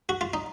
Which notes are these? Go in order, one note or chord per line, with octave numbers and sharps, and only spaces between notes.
F#4
F4
D#4